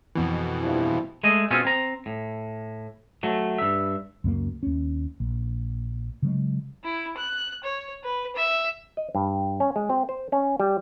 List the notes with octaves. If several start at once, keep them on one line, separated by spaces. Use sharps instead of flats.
F2 B2 E3
G2 F3 E4
G#3 A3 G#4 D#5
B2 C4 C#4 F4 G#4
C4 A#5
A2
F#3 A3
G2 E5
C#2 F#2 G#3 A#3
D#2 C#4
A#1
C#3 F#3 G#3
E4
F#6
C#5
B4
E5
D#5
G2
C#4
G#3
C4
C5
C#4
G3